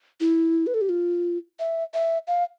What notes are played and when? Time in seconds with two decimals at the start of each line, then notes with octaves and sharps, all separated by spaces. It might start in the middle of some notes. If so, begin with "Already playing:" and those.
0.20 E4
0.67 B4
0.74 A4
0.81 G4
0.89 F4
1.59 E5
1.94 E5
2.28 F5